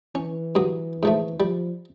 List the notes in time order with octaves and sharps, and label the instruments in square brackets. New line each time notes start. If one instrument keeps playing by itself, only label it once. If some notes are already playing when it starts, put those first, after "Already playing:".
[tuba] E3 [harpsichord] C#4
[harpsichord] G2 F#3 D#6
G#2 F3 A3
[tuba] F3 [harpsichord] G3